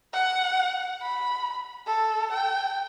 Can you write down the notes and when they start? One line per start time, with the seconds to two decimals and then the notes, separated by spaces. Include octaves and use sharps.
0.13 F#5
1.02 B5
1.86 A4
2.32 G5